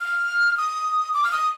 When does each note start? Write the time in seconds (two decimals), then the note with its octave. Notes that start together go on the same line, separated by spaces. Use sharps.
0.01 F6
0.57 D#6
1.14 D6
1.24 F6
1.32 D#6